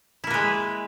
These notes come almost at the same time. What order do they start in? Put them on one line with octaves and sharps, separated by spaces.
E4 A#3 B4 G#3